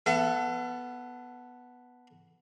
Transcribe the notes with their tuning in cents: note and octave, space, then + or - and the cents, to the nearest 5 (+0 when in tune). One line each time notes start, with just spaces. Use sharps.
B3 +0 A4 +0 E5 +45